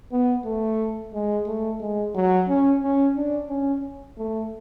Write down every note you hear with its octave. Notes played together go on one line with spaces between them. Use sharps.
B3
A3
G#3
A3
G#3
F#3
C#4
C#4
D4
C#4
A3